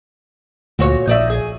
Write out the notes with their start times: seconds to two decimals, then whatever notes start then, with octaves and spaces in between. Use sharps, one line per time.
0.79 D2 A#2 F#4 C#5
1.07 A#1 D#4 D5 E5
1.30 G#4